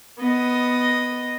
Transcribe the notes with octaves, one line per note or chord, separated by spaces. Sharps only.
B3 D#5